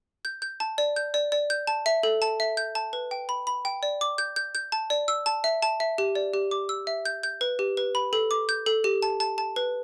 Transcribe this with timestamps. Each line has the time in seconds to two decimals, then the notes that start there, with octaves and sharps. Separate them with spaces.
0.25 G6
0.42 G6
0.60 A5
0.78 D5
0.96 G6
1.14 D5
1.32 D5
1.50 G6
1.67 A5
1.86 E5
2.03 A4
2.22 A5
2.40 E5
2.57 G6
2.75 A5
2.93 B4
3.11 G5
3.29 B5
3.47 B5
3.65 G5
3.83 D5
4.01 D6
4.18 G6
4.36 G6
4.55 G6
4.72 A5
4.90 D5
5.08 E6
5.26 A5
5.44 E5
5.62 A5
5.80 E5
5.98 G4
6.15 D5
6.34 G4
6.51 D6
6.69 E6
6.87 E5
7.05 G6
7.23 G6
7.41 B4
7.59 G4
7.77 B4
7.95 B5
8.13 A4
8.31 D6
8.49 G6
8.66 A4
8.84 G4
9.02 A5
9.20 A5
9.38 A5
9.56 B4